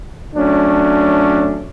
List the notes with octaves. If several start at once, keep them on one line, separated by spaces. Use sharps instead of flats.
F#3 A3 C#4 D4